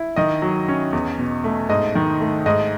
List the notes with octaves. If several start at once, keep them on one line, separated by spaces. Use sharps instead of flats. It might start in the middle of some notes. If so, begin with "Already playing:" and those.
Already playing: E4
D#3 D#5
F#3
C#4
E2
B2
A3
G#2 D#5
D#3
A3
G#2 D#5